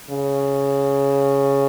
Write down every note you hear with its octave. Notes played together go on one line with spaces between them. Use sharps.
C#3